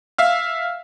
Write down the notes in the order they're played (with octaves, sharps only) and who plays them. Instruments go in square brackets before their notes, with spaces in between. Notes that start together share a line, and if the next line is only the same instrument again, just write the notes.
[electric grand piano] E5 F5 F6